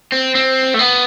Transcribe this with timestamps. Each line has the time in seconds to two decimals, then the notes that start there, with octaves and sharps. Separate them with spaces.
0.12 C4
0.35 C4
0.74 A3
0.79 B3